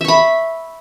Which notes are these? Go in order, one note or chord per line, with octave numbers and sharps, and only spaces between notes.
E5 B5 C#6